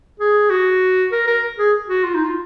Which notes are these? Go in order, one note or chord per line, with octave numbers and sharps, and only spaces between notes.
G#4
F#4
A#4
A#4
G#4
F#4
F4
D#4
F4